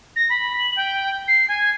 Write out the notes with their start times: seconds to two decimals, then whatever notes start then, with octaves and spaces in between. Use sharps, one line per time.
0.16 A#6
0.30 B5
0.59 F#7
0.76 G5
1.28 C7
1.49 G#5